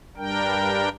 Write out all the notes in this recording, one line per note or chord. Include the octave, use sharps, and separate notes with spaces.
G2 G3 D4 A#4 G5